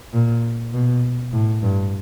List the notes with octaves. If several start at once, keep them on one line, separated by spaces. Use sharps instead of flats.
A#2
B2
A2
G2